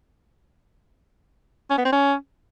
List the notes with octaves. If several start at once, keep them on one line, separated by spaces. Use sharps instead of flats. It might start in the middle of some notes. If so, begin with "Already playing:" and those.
C#4
B3
C4
C#4